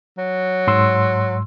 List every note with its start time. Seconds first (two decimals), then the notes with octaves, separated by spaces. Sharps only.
0.18 F#3
0.67 G#2 C6 E6